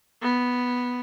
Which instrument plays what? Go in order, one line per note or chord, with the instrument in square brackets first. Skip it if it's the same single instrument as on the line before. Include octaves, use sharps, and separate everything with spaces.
[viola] B3